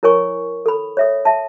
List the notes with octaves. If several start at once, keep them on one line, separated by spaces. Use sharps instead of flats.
E4 A#4 C#5 G#5 C#6
A4 B5
C#5 E5 D#6
E5 A5